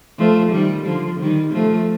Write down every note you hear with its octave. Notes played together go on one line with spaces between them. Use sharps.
F3 A3
D#3 G3
D3 F3
D#3 G3
F3 A3